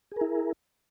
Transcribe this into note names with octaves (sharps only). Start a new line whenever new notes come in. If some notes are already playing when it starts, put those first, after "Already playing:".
E4 G#4 A#4